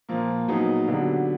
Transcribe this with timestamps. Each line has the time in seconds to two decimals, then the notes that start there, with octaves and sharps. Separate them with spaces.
0.09 A#2 F3 A#3
0.48 A#2 F#3 B3 D#4 G#4
0.88 D3 F#3 B3 D4 G4